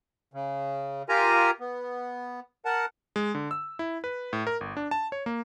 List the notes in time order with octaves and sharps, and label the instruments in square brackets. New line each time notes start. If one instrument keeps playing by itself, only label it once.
[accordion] C#3
F4 G4 A#4 G#5 A#5
B3
A#4 F#5 A5
[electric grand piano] G#3
D3
E6
E4
B4
A2
A#4
G1
D4
A5
C#5
A#3